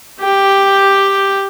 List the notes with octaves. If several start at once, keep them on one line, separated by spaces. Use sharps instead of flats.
G4 G5